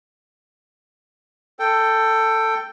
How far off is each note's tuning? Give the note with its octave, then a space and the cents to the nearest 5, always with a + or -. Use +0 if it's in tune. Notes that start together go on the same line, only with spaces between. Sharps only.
A4 +15 G5 +0